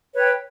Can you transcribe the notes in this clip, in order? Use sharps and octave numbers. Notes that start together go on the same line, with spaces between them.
B4 C#5 G5